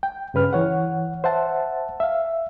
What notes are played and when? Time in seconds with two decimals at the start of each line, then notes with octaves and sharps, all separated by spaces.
0.03 G5
0.34 G2 C#3 B4 F6
0.53 E3 C#5 F#5
1.24 C5 E5 F#5 A5
2.00 E5 F5